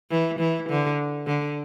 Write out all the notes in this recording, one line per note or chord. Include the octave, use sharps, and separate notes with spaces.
E3
E3
D3
D3